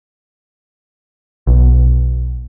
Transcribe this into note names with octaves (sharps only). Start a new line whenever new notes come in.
B1